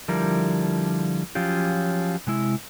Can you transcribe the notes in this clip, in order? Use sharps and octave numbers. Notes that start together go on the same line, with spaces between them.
D3 F3 G3 E4 A#4
F3 F#3 C#4 F4 G4
C3 G#3 E4